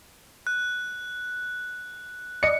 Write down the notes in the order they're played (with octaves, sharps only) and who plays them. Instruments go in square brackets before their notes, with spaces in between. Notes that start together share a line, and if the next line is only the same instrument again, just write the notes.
[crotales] F#6
[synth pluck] D5 D#5 [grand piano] C#7